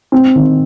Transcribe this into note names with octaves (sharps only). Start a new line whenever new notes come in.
C4
D#3